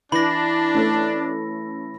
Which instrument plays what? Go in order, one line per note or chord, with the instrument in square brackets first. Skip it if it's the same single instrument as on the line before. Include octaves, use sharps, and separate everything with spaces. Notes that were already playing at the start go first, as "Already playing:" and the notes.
[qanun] E3 [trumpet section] D4 [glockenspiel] B5 A#6
[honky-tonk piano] A3 C#4 A4